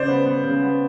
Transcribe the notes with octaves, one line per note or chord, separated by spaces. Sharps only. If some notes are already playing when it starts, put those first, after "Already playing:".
Already playing: C#3 C5 D5
B3
B3
C#3
B3